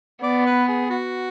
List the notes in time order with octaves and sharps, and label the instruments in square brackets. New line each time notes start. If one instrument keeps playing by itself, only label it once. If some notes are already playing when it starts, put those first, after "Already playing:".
[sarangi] B3 [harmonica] D5
[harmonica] B4
G#4
F#4